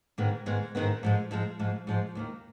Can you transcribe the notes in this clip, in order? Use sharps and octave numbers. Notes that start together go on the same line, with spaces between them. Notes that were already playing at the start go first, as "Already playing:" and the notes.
G#2 D#3 G#3 B3
G#2 D#3 G#3 B3
G#2 D#3 G#3 B3
G#2 F3 G#3
G#2 F3 G#3
G#2 F3 G#3
G#2 F3 G#3
D#2 D#3 A#3